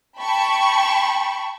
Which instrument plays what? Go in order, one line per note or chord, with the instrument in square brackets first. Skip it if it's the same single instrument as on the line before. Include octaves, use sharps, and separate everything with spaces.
[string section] G5 A5 B5 C#6